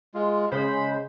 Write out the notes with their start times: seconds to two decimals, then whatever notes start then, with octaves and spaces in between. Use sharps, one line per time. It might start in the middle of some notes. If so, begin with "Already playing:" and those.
0.14 G#3 F4
0.52 C#3 G#3 C5 B5